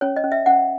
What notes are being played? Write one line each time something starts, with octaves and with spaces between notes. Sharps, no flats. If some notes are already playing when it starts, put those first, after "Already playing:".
C#4 C#5
D#5
C#4
E5
C#4 F#5